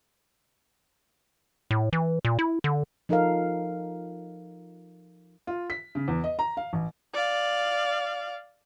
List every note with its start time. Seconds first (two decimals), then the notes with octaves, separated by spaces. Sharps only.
1.71 A2
1.93 E3
2.25 A#2
2.39 E4
2.64 D3
3.09 F3 D#4 A4 A#4 F5
5.47 F4
5.70 B6
5.95 C#3
6.08 E2
6.24 D#5
6.39 A#5
6.57 F5
6.73 A1
7.14 D5 F5